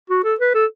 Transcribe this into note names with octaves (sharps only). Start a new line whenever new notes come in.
F#4
A4
B4
A4